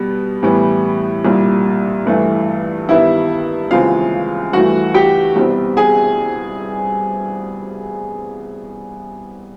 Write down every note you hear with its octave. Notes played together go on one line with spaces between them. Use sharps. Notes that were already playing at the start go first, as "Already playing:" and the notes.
Already playing: B2 G3 B3
A2 E3 G3 B3
C2 A#2 G3
G2 E3 A3
G2 D#3 G3 B3 E4 E5
D#2 C#3 E3 G#3 C4 F4 F5
G2 E3 A3 F#4 F#5
G4 G5
C2 B2 G3 C4
G#4 G#5